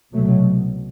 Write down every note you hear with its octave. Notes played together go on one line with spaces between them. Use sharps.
C2 B2 F#3 A3